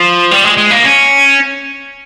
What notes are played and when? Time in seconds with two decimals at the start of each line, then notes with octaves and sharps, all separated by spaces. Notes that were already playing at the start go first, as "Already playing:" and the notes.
Already playing: F3
0.31 G3
0.44 G#3
0.57 G#3
0.71 A#3
0.84 C#4